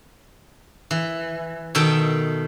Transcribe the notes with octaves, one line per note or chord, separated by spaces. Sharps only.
E3
B2 D#3 A4 G5